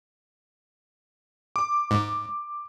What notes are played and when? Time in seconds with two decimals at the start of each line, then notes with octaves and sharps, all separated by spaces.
1.56 D6
1.91 G#2